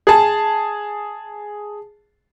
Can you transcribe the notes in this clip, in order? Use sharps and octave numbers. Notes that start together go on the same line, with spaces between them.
G#4 A5